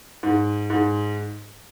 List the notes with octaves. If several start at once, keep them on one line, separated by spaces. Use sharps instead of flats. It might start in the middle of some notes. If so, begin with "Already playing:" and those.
G#2
G#2